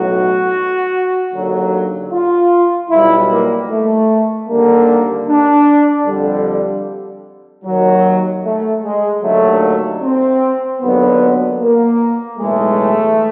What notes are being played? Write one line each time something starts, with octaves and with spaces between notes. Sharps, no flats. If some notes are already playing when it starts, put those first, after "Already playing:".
Already playing: B1 A2 F#3 F#4
D#2 D3 F#3
F4
B1 B2 G3 E4
A#3
A3
D#2 D3 G3 A#3
D4
F2 D3 G3
D#2 D#3 F#3
A3
G#3
D#2 D3 F#3 A3
C4
D#2 D3 F#3 B3
A#3
B1 A2 E3 G#3 A3